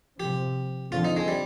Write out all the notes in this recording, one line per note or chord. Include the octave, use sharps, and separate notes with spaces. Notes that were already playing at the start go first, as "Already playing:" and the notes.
C3 F3 C4 G4
D3 F3 C4 F4
D#4
G#3
G3